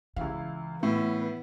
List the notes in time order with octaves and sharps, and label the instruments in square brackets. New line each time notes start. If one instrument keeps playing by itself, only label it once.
[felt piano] C#2 E4 F5 [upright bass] E3
[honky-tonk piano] A2 [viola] B3 [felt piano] E4